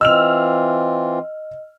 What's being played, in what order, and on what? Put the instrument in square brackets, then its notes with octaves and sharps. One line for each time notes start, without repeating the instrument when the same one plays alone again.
[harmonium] E3 C4 F4 [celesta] D#5 [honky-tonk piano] E6 F6 F7